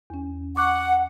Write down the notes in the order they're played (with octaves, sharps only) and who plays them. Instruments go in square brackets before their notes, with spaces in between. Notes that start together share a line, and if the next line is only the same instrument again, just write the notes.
[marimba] E2 C#4
[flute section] F#5 [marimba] C#6 D6 F#6